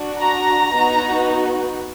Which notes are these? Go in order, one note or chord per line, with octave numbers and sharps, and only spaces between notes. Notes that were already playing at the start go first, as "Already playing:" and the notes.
Already playing: D4 F#4
A#5
B3 D#4 F#4